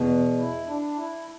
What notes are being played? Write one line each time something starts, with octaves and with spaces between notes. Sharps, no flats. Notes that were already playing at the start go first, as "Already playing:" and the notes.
Already playing: E2 B2
E4
D4
E4